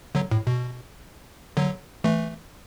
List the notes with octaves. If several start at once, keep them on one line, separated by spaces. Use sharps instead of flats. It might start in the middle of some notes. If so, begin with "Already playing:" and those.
D3 F#3
A2
B2
D3 F#3
E3 A3